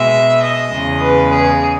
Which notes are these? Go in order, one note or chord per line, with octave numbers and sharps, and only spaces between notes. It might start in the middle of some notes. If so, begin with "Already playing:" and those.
Already playing: B2 G#3 E5
D#5
E2 C#3 G#3
B4
G#4